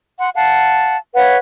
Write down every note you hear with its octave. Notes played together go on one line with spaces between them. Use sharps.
F#5 C6
F5 F#5 A5
B4 C#5 F5 F#5